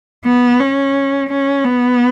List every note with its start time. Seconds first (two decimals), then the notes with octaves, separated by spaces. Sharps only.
0.25 B3
0.59 C#4
1.29 C#4
1.64 B3